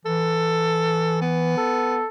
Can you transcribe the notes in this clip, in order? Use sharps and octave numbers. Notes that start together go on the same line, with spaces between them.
E3 A4
B3
A4